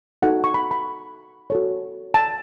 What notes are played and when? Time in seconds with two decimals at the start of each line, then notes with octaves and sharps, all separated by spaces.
0.22 D#4 F#4 A4 F#5
0.44 C#6
0.54 B5
0.71 B5
1.50 F#4 A4 C#5
2.14 A5